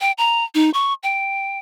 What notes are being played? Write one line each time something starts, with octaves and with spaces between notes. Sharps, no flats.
G5
A#5
D#4
C#6
G5